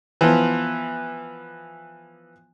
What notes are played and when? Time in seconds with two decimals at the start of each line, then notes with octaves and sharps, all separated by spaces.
0.21 E3 F3 B3